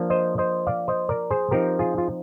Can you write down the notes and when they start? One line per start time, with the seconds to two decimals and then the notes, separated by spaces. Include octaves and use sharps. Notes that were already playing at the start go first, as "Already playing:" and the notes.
Already playing: F3 A#3 D4
0.10 C5 D#5
0.38 C5 D#5
0.67 D5 F5
0.88 C5 D#5
1.09 A#4 D5
1.30 G#4 C5
1.51 F3 C4 D#4 G4 A#4
1.79 F4 G#4
1.98 F4